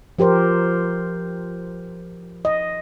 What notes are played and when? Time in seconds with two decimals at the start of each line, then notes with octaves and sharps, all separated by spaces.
0.19 F3 G4 A#4 C5
2.45 D#5